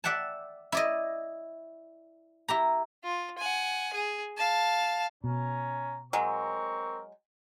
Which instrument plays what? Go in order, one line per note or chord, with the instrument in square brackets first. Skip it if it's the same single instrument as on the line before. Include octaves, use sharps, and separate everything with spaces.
[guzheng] D5 E5 F#5 G5 A5
E4 D5 D#5
E4 G4 A#5
[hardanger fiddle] F4
F#5 G#5
G#4
F5 A5
[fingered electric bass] B2 [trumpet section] C#4 A#5
[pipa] F#3 G#3 [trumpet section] C4 A#4 C#6